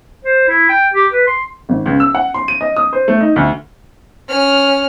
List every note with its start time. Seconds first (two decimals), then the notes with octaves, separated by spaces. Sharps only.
0.24 C5
0.48 E4
0.69 G5
0.94 G4
1.13 B4
1.27 C6
1.69 G#1
1.86 C#2
2.00 E6
2.15 F#5
2.34 C6
2.48 D#7
2.61 D#5
2.77 D#6
2.93 C5
3.08 A3
3.21 D#4
3.36 D2
4.28 C#4 F6